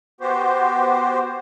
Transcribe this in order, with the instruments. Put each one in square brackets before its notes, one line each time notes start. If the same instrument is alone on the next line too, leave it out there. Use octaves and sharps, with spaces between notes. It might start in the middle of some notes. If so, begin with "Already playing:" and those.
[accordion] B3 F#4 G4 C5